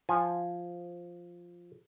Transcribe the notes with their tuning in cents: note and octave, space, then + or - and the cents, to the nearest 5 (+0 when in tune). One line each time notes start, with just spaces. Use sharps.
F3 +0 G#5 +0